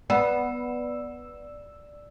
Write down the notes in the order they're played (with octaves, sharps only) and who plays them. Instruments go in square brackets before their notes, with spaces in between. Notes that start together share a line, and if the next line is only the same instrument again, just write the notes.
[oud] B3 [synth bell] D5 E6 E7